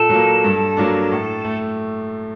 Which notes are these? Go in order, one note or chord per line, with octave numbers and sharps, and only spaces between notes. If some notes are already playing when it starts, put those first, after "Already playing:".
Already playing: A#2 A4
F#3 A#3
G2
F#3 A#3 D4
A2
A3